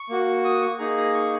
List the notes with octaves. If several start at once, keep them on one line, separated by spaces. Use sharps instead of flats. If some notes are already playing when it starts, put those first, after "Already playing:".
Already playing: C#6
A#3 F#4
D#6
C#6
A#3 D#4 G#4 A#5
A#5
C#6